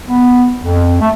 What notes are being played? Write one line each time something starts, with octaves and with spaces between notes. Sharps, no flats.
B3
F2
A3